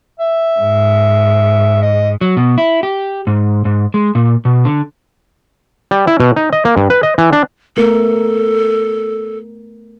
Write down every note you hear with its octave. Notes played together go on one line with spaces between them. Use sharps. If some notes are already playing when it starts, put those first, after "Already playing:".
E5
G#2
D#5
F#3
B2
E4
G4
G#2
G#2
G#3
A#2
B2
D3
G3
E4
B2
D#4
D#5
A#3
G2
B4
D#5
E3
D4
A3 B3 A4 A#4